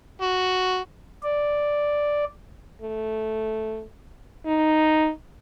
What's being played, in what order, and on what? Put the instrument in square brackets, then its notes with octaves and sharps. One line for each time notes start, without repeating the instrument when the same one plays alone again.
[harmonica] F#4
[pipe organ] D5
[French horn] A3
D#4